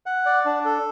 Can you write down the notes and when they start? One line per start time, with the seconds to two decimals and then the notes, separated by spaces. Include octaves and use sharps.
0.06 F#5
0.26 D5
0.45 D4
0.65 A4